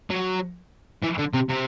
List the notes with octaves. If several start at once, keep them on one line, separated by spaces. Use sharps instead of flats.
F#3
E3
D3
C3
C3